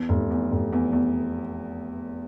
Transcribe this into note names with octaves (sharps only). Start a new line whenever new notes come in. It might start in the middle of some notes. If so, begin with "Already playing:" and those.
Already playing: E2
F1
E2
F1
E2
E2